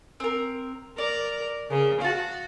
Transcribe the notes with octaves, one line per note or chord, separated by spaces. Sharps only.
C4 A#4
A#4 D5
C#3 A#4
F#4 F5 A5